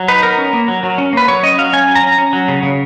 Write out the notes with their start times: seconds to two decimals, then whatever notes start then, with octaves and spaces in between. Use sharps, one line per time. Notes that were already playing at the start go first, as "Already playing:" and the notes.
Already playing: F#3
0.08 D#4 B4
0.23 B3 A#4
0.38 C#4
0.53 A#3
0.68 F#3
0.83 F#3
0.98 C#4
1.13 A#3 B4
1.28 F#3 C#5
1.43 C#4 D#5
1.58 F#3 F5
1.73 C#4 G#5
1.88 F#3
1.96 A#5
2.03 C#4
2.18 C#4
2.33 F#3
2.48 C#3
2.63 C#3